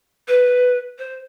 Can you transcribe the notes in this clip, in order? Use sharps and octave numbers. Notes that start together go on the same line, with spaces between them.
B4
C5